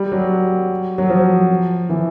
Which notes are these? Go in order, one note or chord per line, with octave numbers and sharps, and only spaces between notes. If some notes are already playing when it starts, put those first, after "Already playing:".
Already playing: G3
F#3
F#3
F3
E3